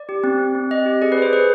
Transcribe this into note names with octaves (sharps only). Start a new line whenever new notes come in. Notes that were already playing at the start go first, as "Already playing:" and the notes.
Already playing: D5
G4
C4
C4
C4
C4 D#5
G4
G#4 D5
B4
G#4 C5
G#4 B4